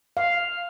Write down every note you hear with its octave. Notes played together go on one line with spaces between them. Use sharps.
F5